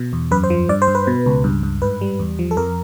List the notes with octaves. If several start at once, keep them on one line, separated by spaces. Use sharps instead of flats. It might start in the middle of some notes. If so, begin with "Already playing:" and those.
Already playing: B2
E2
F#2 B4
C5
F3
G2 D5
C5
G2
B4
B2
C#2
G2
G2
G#2 B4
G3
E2
F3
A4
F2 A#4